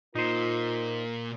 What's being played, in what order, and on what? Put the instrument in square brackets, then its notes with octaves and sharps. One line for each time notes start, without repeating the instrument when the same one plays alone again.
[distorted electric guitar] A#2 [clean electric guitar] D#4 C5 [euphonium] F4 [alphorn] A#4